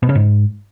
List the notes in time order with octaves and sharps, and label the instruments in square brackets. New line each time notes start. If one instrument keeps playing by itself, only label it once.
[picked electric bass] B2
C#3
G#2